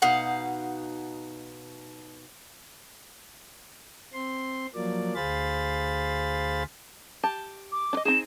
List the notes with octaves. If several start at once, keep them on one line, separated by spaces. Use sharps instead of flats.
B2 D#4 F5 F#5
C4 C6
F3 F#3 A#3 D5
D2 G#4 C5 F5 B5 A6
G4 A5
D6
D4 D#5
C4 D#4 G#4 E7